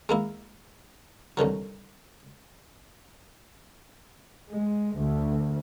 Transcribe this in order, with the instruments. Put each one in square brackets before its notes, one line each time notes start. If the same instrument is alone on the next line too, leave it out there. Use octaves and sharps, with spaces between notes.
[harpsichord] G#3 A#3 E4
C2 D3 D#3 F#3
[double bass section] G#3
D2